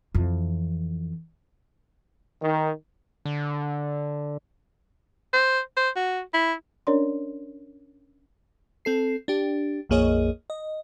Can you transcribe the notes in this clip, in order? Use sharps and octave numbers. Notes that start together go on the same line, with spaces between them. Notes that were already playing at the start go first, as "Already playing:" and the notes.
F2 E3
D#3
D3
C5
C5
F#4
E4
C#4 D4 A#4 C#5 D5 C6
C4 A4 C7
D4 G4
A#1 F2 A#3 G#4 C#5 D#5
D#5